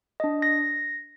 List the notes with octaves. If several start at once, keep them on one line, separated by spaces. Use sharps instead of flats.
D4 D#5
A#6